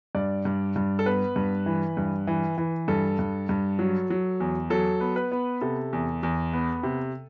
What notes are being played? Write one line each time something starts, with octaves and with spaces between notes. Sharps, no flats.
G2 D5
G2
G2
A4
B3 B4
G2
E3
G2
E3
E3
G2 A4
G2
G2
F#3
F#3
E2
F#3 A4
B3
B4
B3
C3 A4
E2
E2
B3
C3